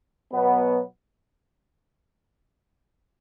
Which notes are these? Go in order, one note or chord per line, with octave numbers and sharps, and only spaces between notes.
B2 F#3 B3